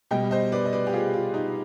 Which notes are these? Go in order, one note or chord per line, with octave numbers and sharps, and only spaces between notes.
B2 G3 D#5 G5
C5 D#5
B4 D5
D#5
B4 D5
G4
F4 G#4
F4
D#4